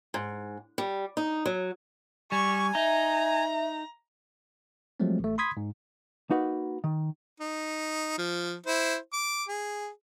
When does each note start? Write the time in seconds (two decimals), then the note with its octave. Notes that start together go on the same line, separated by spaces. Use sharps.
0.14 G#2
0.78 G3
1.17 D#4
1.46 F#3
2.32 G3 G#5 C#6
2.75 D#4 E5 A#5
5.00 F3 F#3 G#3 A3 C4
5.20 A1 A3
5.38 B5 C6 D#6 G#6 B6
5.57 G#2
6.30 A#3 D#4 F#4 B4 F#5
6.84 D#3
7.40 D#4
8.18 F3
8.66 E4 C5
9.13 D6
9.49 G#4